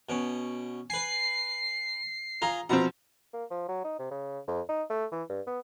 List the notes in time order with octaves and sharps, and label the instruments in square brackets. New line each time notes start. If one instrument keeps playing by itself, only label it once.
[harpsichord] B2 C#4
[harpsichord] B4 G#5 [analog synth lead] C7
[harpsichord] F4 G#4 [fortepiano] A#5
[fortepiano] B2 F3 C4 [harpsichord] A#5
[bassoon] A#3
F3
F#3
D#4
C3
C#3
F2
D#4
A3
E3
G2
B3